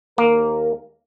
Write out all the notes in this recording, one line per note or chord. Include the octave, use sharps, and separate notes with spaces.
D#2 A#3 A#4